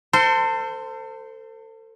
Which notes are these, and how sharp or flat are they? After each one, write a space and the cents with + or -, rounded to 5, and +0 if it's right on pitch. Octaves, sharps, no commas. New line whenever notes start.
A4 +35 C5 -15